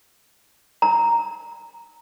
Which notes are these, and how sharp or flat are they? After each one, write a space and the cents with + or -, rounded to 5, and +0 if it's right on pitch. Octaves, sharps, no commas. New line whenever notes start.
A#5 -5